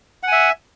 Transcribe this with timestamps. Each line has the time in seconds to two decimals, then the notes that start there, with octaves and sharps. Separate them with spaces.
0.23 F#5
0.28 G#5
0.32 E5